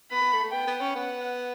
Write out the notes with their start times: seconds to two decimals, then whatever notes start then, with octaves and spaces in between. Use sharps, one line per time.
0.11 B3 B5
0.21 B3
0.33 A3
0.43 A3
0.53 B3 G5
0.67 B3
0.80 C#4
0.95 B3 F#5